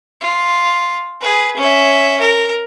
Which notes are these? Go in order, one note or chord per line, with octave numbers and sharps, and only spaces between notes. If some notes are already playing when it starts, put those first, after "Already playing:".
F4
G#4 B4
C#4 E5
A#4